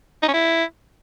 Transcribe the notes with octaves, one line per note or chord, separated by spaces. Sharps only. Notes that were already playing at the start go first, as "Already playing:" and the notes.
D#4
C#4
E4